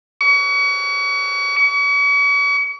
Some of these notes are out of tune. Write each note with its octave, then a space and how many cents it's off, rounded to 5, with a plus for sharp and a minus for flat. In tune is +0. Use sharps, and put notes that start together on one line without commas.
C#6 +35
C#6 +40